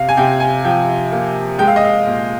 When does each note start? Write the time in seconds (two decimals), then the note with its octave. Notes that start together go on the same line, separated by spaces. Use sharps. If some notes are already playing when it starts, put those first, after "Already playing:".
Already playing: C3 F5
0.09 G#5
0.17 C3 G5
0.40 G#5
0.65 F3 G5
1.12 A#3
1.59 G#3 G5
1.68 F5
1.76 D#5
1.85 F5
2.06 A#2